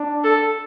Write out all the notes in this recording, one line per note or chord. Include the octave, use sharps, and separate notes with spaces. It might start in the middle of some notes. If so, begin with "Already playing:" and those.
Already playing: D4
A4